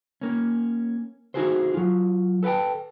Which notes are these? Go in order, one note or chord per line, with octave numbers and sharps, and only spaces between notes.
A#3 C#4
D#4 F#4 G#4 A4 C5
F#3 F4
A4 B4 F5 G5 A5